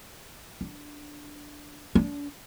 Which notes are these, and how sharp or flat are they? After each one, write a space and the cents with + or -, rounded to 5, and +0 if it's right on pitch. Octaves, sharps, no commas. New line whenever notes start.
D4 +0
D4 -35